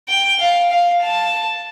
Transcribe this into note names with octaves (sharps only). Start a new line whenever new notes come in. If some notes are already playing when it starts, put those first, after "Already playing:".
G5
F5
F5
A5